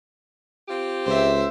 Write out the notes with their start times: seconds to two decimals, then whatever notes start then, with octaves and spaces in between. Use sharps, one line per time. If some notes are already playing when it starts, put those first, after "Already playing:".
0.68 C4 F4 G4
1.06 C#2 C5 E5